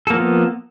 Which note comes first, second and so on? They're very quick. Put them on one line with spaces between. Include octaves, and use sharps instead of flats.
A4 A#3 F3 B3